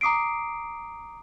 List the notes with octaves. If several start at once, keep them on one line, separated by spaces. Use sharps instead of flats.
A#5 D6 D#6 C7 D7